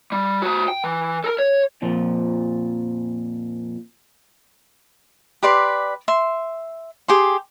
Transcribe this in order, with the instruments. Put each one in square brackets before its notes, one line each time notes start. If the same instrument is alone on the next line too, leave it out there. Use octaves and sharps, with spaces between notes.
[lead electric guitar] G3
F#4 C5
G5
E3
A4 A#4
C#5
[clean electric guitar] F2 A#2 F3
[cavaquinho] G4 B4 D5 C6
E5 C6
G4 G#4 C6